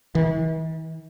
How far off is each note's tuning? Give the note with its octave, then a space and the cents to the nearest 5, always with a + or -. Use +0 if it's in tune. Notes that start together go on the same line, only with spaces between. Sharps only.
E3 -45